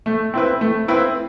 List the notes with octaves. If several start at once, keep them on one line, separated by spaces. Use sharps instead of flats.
A3
C4 E4 B4
A3
C4 E4 B4